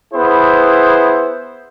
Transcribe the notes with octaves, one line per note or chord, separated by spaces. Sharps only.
B3 E4 G#4 C5